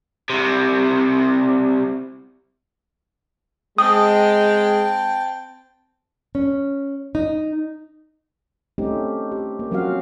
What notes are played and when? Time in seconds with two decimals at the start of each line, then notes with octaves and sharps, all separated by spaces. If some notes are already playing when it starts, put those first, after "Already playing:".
0.30 C2 C3
3.78 G#3 C4 G5 A5 D#6
6.35 C#4
7.15 D#4
8.78 A3 C4 C#4 D#4 G4
9.32 G4
9.59 A#3
9.71 F3 F#3 C4 C#4 F#4 F5